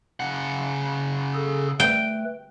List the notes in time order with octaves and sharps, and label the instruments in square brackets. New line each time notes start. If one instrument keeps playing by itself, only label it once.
[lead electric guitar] C#3 F#5
[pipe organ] G#4 A4
[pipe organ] A3 B4 [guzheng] G5